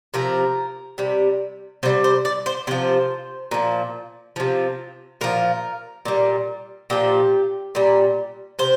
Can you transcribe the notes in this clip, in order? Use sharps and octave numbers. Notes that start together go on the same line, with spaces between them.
C3 F3 A#4
C3 G3
C3 G3 C5
C5
D5
C5
C3 F3 C5
A#2 F3
C3 F3
A#2 F3 A#4
A#2 G3
A#2 F3 G4
A#2 G3
C3 C5